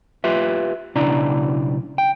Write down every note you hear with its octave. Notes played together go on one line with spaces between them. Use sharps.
F4 G4 B4 E5
B1 C#3 D4 E4 D5 A#5
G5